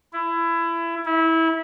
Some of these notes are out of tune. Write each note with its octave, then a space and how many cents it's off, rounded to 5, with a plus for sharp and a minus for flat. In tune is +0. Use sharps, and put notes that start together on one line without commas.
E4 +25
E4 -20